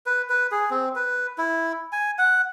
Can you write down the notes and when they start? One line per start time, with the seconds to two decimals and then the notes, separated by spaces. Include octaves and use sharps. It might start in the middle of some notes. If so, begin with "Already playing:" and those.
0.06 B4
0.30 B4
0.51 G#4
0.71 C4
0.96 B4
1.38 E4
1.92 G#5
2.18 F#5